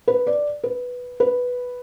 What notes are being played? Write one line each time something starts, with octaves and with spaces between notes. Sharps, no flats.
B4
D5
B4
B4